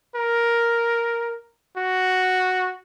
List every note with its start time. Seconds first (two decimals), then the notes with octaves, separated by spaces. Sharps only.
0.16 A#4
1.77 F#4